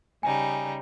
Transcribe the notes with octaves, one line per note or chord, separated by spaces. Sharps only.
C#3 G3 D#4 G#5